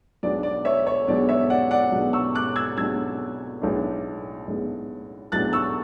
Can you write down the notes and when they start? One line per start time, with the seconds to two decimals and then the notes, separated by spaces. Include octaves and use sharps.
0.23 B1 B2 G#3 B3 D4 D5
0.43 D5
0.65 C#5 E5
0.87 C#5
1.07 B1 B2 G#3 B3 D4 D5
1.29 C#5 E5
1.50 D5 F#5
1.71 D5 F#5
1.92 B1 B2 G#3 B3 D4
2.13 C#6 E6
2.35 D6 F#6
2.56 E6 G#6
2.77 B1 B2 G#3 B3 D4 E6 G#6
3.62 B1 A2 G#3 B3 D4
4.47 B1 A2 G#3 B3 D4
5.32 B1 A2 G#3 B3 D4 F#6 A6
5.53 C#6 E6